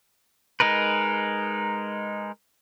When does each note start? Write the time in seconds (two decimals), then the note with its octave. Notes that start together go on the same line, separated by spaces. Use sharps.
0.60 G#3 D#4 A#4 B4